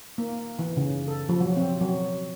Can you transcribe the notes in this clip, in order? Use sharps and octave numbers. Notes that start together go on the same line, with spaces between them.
A#3
E3
C#3
A4
F3
F#3
C4
F#3